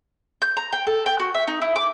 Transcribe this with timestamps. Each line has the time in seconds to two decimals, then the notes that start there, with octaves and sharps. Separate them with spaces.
0.42 G6
0.57 A#5
0.72 G5
0.87 A4
1.06 G5
1.20 F#4
1.34 E5
1.47 D#4
1.62 E4
1.76 D6